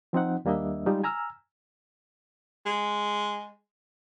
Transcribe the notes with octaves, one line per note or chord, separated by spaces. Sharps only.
F3 C4 D#4 F#5
D#2 G3 A#3 D4 D#5 E5
G3 G#3 D#4 F4 G4
G#5 A#5 E6 F6
G#3